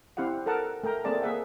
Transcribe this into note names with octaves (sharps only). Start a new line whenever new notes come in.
C4 E4 G4 F5 F#5
A4 A#4 F#5 A5
A3 A#4 G5 A#5
A3 A#3 C4 G#4 D5 A5
A#3 G#4 E5 F#5